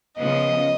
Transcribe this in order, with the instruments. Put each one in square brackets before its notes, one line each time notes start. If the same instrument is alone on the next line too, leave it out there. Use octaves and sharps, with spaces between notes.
[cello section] C#3 F3 B3 [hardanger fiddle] D#5